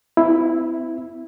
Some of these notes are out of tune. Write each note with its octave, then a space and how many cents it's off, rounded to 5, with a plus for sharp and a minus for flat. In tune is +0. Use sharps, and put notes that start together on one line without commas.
C4 -40 E4 +0